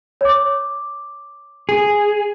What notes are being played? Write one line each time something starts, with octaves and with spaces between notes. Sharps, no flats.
C#5 D6
G#4